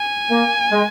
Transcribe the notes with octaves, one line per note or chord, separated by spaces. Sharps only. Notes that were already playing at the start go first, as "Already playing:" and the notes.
Already playing: G#5
A#3
G#3